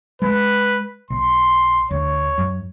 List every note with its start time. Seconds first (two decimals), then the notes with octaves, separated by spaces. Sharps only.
0.22 G#3 B4
1.10 B1 C6
1.91 D2 C#5
2.38 F#2